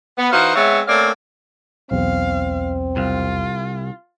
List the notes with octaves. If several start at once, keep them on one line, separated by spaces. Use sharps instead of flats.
B3
E3 D#4 F#4 C5 F5
G#3 B3 C4 C#5 E5
A3 A#3 C4 C#4 D5 F5
B1 E2 C4 F5
C2 F4